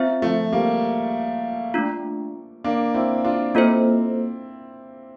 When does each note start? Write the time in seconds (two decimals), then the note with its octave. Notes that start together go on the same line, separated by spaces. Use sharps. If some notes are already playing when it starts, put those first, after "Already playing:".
Already playing: C4 F4 C5 E5
0.22 F3 A3
0.52 G3 A#3
1.74 A3 D4 F4
2.64 A#3 D4
2.94 C4 E4
3.24 D4 F4
3.55 A#3 C4 E4 F4 A4 C5